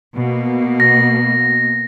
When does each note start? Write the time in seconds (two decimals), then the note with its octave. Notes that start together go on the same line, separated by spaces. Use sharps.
0.16 B2 A#3
0.80 A#6